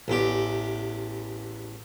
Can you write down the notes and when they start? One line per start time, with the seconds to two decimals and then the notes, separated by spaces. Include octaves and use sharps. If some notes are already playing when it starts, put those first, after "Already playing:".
0.08 A1 E2 G4